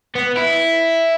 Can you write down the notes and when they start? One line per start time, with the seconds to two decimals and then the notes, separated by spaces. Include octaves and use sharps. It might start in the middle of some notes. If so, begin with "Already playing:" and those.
0.15 B3
0.37 E4